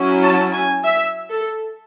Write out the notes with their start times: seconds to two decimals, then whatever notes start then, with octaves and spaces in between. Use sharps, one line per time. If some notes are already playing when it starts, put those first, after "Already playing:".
Already playing: F#3 C#4 E4
0.23 A5
0.54 G#5
0.84 E5
1.31 A4